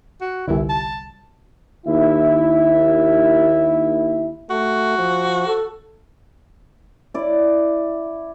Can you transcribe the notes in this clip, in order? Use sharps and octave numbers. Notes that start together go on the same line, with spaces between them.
F#4
G1 C2 E4
A5
D#2 E4 E5
A3 F#4
F3
A4
E4 D5